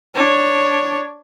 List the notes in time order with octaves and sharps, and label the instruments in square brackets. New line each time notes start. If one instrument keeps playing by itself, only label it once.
[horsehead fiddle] D4 C#5